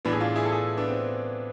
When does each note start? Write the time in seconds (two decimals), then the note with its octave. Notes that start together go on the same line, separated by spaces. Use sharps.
0.05 A2 E3 B3 D4
0.13 G#4
0.20 D4 F4
0.35 E4 G#4
0.45 A4
0.51 E4 G#4
0.77 B3 D4
0.88 C4